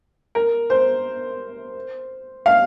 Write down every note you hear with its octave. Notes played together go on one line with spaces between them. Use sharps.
A#4
C5
F5